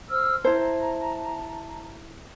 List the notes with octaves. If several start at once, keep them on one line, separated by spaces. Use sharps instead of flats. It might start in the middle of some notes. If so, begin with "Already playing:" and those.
C5 E6 F6
E4 C5 A5 A#5